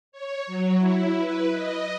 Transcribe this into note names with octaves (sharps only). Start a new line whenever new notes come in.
C#5
F#3
E4
B4
D#5